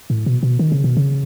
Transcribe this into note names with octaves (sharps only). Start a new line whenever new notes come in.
A2
B2
B2
D#3
C#3
B2
C#3